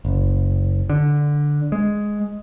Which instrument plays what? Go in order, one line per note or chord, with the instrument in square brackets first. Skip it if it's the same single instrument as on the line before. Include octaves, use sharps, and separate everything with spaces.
[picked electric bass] F#1
D3
G#3